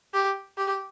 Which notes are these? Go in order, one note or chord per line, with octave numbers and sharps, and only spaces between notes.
G4
G4